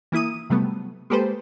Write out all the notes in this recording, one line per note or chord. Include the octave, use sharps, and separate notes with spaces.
E3 A#3 E4 D#6 D#7
C3 F#3 G3 A3 B3
G#3 A#3 G4 A4 B4 C5